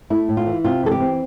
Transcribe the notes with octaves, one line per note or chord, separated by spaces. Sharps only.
A3 E4
A2
F4
E3
C3 F4
E3 A4
G4
C4